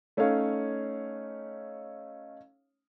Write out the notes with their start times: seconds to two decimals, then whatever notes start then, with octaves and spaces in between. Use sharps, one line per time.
0.17 A3 C#4 D#4 C#5 F5